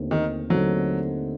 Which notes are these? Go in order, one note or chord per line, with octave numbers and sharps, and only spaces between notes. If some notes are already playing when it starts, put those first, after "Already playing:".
Already playing: D#2 D3 A3 C4 D#4
D#3
D#2 D3 F#3 A3 C4 D#4